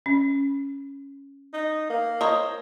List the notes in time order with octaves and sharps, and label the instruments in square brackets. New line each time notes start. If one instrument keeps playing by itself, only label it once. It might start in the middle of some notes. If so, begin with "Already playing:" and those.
[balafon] C#4
[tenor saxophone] D#4
A#3
[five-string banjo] C5 C#5 D#5 [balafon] A#5